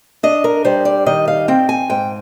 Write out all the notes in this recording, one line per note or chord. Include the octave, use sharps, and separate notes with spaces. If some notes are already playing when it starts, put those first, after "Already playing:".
D4 D#5
A#4
G3 C5
D5
D#3 D#5
F5
C4 G5
G#5
G#2 G5